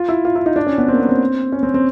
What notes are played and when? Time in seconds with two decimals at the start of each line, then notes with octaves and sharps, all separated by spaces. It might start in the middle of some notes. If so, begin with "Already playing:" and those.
Already playing: F4
0.09 E4
0.25 F4
0.36 E4
0.46 D#4
0.56 D4
0.67 C#4
0.78 B3
0.88 C4
0.93 A#3
1.00 B3
1.09 C4
1.52 C#4
1.63 C4
1.74 C4